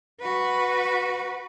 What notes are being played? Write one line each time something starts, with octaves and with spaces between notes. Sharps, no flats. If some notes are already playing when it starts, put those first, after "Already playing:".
F#4 B4